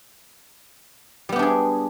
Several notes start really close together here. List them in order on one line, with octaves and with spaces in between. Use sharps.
G3 B3 G4 D4 G#4